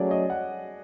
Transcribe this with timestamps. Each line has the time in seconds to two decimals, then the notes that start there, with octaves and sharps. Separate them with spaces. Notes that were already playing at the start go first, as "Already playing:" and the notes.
Already playing: F#3 A3 C#4 G#4 D5
0.11 D#5
0.30 F#5